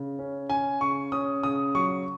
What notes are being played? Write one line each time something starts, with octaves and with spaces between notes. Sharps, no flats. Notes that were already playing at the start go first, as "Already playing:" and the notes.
Already playing: C#3
C#4
C#4 G#5
C#3 C#6
C#4 D#6
C#3 D#6
F#3 C#6